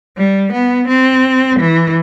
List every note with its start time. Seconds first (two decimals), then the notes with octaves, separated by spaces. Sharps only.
0.17 G3
0.52 B3
0.88 C4
1.59 E3